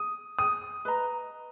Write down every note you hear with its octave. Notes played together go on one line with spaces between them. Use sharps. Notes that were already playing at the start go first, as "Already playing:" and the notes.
Already playing: D#6
D#6
B4 D#5 A#5